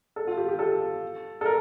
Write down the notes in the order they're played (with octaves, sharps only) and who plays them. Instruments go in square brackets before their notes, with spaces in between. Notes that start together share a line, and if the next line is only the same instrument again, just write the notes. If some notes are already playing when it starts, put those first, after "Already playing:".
[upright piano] A4
F4
G4
G4
A4
A4
A#4